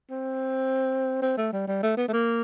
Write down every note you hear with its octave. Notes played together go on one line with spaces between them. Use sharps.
C4
C4
A3
G3
G3
A3
B3
A3
A#3